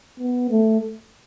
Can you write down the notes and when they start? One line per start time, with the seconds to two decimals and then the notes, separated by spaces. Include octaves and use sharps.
0.20 B3
0.51 A3